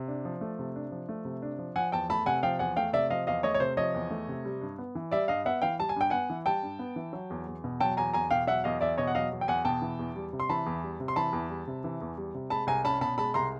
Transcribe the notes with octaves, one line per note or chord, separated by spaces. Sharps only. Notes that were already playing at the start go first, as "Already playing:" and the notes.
Already playing: C3
D4
F3
A3
C3
D4
F3
A3
C3
D4
F3
F3 F#5 G#5
E2 G5 A5
A3 A5 B5
C3 F#5 G#5
F3 F5 G5
E2 F#5 G#5
A3 F5 G5
C3 D5 E5
F3 D#5 F5
E2 D#5 F5
A3 C#5 D#5
C#5
C3 C5
F3 C#5 D#5
E2
A3
C3
G3
G2
B3
E3
G3 D5 E5
G2 D#5 F5
B3 E5 F#5
E3 F5 G5
G3 A5
G#5
G2 G5
B3 F#5 G#5
E3
G3 G5 A5
G2
B3
E3
F#3
E2
E2
B2
F#3 G5 A5
E2 G#5 A#5
E2 G#5 A#5
B2 F5 G5
F#3 E5 F#5
E2 D#5 F5
E2 D5 E5
B2 C#5 D#5
F#5
F#3 D#5 F5
E2
G5
E2 F#5 G#5
B2 G5 A5
E3
E2
G3
C3
C6
E3 A5 B5
E2
G3
C3
C6
E3 A5 B5
E2
G3
C3
E3
E2
G3
C3
G#3 A5 B5
C2 G#5 A#5
C#4 A5 B5
B2 A5 B5
G#3 A5 B5
C2 A#5 C6